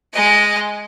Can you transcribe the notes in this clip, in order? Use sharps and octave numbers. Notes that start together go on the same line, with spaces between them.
G#3 D#5